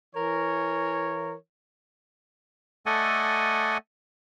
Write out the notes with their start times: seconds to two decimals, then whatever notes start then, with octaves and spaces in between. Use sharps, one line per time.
0.15 E3 A#4 C#5
2.86 A3 A4 D5 D#5 F#5 G#5